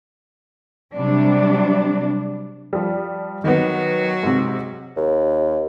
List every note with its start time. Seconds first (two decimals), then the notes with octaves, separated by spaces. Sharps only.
0.95 C3 F#3 G3 D4
2.73 F3 G3
3.44 D#3 F#3 B3 F#4
4.23 G#2 C3
4.96 D#2